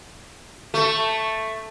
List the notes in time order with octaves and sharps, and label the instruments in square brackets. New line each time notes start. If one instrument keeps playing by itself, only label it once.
[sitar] A3